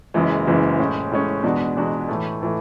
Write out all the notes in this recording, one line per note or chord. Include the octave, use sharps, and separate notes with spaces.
F#1 F#2 E3 G#3
F#1 F#2 E3 G#3
A2 G#3 C#4
A2 G#3 C#4
E2 B2 G#3 D4 F#4
E2 B2 G#3 D4 F#4
A2 E3 A3
A2 E3 A3